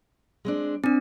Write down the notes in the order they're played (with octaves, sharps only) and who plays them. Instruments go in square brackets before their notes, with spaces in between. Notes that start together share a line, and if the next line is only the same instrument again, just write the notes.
[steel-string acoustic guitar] G#3 C4 D4
[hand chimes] C4 D4 [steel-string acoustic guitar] G#5